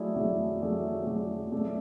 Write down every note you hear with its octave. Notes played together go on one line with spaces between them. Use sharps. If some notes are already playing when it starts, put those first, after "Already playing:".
Already playing: F#3 A3 E4 G#4 D5
F#3 A3 E4 G#4 D5
F#3 A3 E4 G#4 D5
F#3 A3 E4 G#4 D5
A3 C#4 G#4 D5